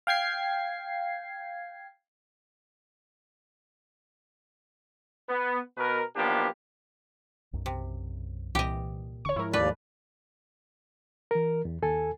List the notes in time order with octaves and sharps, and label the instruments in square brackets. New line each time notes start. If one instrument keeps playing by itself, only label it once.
[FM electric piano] F5 G5 G#6 C7
[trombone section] B3
B2 A#4 B4
B1 F3 A#3 B3 D4 G4
[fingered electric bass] B1 F#2
[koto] C3
[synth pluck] C2 E3 [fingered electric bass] A#2 [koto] G4 D#5
[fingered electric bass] D1 D3 [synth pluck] C#5 C#6
[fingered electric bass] G#2 F3 G#3 [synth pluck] E4 A#4
[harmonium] D#2 D5 [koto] A3 B4
[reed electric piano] E3 A#4
E2
D#2 A4 G#5